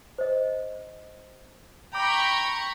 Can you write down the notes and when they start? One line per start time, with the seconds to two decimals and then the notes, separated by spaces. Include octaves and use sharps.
0.18 C5 D#5
1.95 G5 A#5 B5 C#6 D6